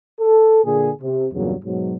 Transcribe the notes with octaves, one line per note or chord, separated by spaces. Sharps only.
A4
A#2 D3 G#4
C3
E2 G2 A#2 C#3 F#3
G#2 B2 F#3